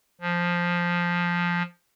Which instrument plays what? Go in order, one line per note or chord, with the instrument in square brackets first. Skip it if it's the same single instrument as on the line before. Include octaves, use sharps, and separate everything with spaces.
[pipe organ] F3